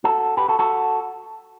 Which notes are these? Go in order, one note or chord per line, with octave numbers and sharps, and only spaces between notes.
F#4 A4
G4 B4
F#4 A4
F#4 A4